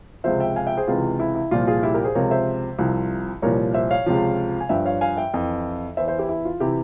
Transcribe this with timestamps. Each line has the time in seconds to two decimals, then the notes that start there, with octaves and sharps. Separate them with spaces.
0.24 C#2 C3 F3 C5 E5
0.40 E5 G5
0.56 F5 G#5
0.66 E5 G5
0.77 G#4 C5
0.88 C#2 C3 E3 F4
1.20 E4
1.35 E4
1.51 C2 A#2 F3 F4
1.68 F4 G#4
1.83 E4 G4
1.94 G4 A#4
2.04 G#4 C5
2.15 C#2 C3 F3 A#4 C#5
2.31 C5 E5
2.79 C2 C3 F3
3.42 C2 A#2 F3 A#4 C#5
3.74 C5 E5
3.90 C#5 F5
4.06 C#2 C3 F3
4.60 G#5
4.69 G2 F3 E5 G5
4.85 C#5 F5
5.01 F5 G#5
5.17 E5 G5
5.34 F2 E3
5.97 E2 E3 C5 E5
6.08 C5 E5
6.19 E4 G4
6.29 E4
6.45 F4
6.60 C3 E3 E4 G4